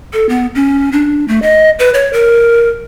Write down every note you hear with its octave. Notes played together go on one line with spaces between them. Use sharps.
A4
B3
C#4
D4
A3
D#5
B4
C#5
A#4